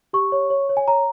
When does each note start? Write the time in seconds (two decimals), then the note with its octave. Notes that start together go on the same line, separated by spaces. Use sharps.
0.13 G4 C#6
0.32 C#5
0.50 C#5
0.69 C#5
0.77 G#5
0.88 C#5 A#5